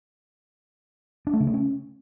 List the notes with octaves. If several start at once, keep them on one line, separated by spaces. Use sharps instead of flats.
D4
A3
C#3
A3
C#4